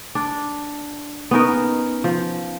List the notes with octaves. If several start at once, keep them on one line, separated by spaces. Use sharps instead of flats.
D4
B3 C#4 D#4 A#4
F3